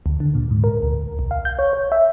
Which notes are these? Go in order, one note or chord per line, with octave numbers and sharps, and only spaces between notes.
D2
D3
A#2
G#2
A#4
D2
B1
F5
G6
C#5
C#5
E5